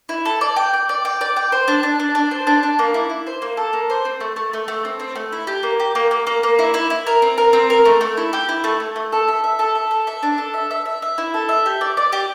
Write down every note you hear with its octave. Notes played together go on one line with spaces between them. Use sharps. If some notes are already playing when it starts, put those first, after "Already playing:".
E4
A4
D5
G5
D5
D5
G5
D5
G5
C5
D4
D4
D4
D4
C5
D4
D4
A#3
E4
E4
C5
A#3
A4
A#3
C5
C4
A3
A3
A3
A3
C4
C4
A3
E4
G4
A#3
G4
A#3
A#3
A#3
A#3
E4
E4
E4
A#4
C4
A#4
C4
A#4
A3
A3
E4
G4
E4
A3
A3
A3
A4
E5
E5
A4
E5
A4
E5
D4
A4
E5
E5
E5
E5
E4
A4
E5
G4
D5
D5
G4